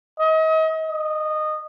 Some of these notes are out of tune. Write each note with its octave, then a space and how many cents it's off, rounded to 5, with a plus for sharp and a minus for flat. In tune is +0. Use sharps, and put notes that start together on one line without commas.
D#5 +35
D#5 -20